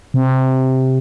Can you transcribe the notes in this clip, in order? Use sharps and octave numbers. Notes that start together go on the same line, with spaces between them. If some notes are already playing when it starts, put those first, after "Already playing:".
C3